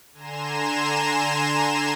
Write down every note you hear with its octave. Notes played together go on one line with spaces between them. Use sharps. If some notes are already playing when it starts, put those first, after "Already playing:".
D3 G#5 A#5 C6 E7